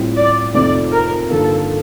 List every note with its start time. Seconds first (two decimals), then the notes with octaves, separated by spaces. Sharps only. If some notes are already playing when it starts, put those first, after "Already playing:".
Already playing: A2 G3 C4 F4
0.16 D5
0.54 F2 C3 F3 A3 D#4 D5
0.92 A#4
1.30 G2 D3 F3 A#3 D#4 A4